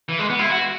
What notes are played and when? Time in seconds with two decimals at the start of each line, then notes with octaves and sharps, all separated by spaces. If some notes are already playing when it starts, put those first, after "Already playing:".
0.09 E3
0.19 G#3
0.30 B3
0.39 E4
0.49 F#4